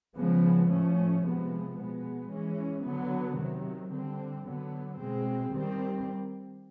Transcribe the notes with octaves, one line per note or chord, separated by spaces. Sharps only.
C#3 F3 G#3 B3
A2 F3 A3 C#4
C3 F3 G#3 B3
B2 G#3 B3
E3 G#3 C#4
D3 F#3 B3
C3 D#3 F#3
D3 G3 C4
D3 F#3 B3
B2 G#3 C4
D#3 G3 C4